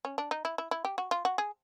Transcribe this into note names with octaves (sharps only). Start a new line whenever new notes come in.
C#4
D4
D#4
E4
E4
E4
G4
F#4
F4
F#4
G#4